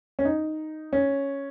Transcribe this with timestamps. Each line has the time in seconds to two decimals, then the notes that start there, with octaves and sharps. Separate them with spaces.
0.19 C#4
0.25 D#4
0.93 C#4